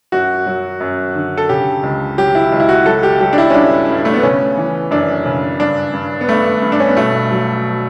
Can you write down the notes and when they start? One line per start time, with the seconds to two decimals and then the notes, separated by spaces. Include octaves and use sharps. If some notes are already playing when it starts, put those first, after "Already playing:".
0.12 F#2 F#4
0.46 F#3
0.80 F#2
1.15 D3
1.37 A4
1.49 C#3 G4
1.83 C#2
2.18 F#3 G4
2.35 E4
2.52 C#2
2.60 E4
2.69 F#4
2.85 F#3 A4
3.03 G4
3.20 F#3 G4
3.33 D4
3.38 E4
3.50 C#4
3.54 G2 D4
3.89 G2
4.05 A3
4.14 B3
4.23 C#3 C#4
4.57 E3
4.91 F#2 D4
5.26 C#3
5.60 G2 D4
5.93 G2
6.21 B3
6.29 G2 A3
6.62 G2
6.72 D4
6.80 C#4
6.88 B3
6.96 B2 A3
7.31 F#3